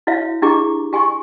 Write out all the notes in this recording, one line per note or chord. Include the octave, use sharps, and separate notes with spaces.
E4 F#4 C#5 E5 F5
D4 E4 G4 G#4 A#5 D6
G4 G#5 C6 C#6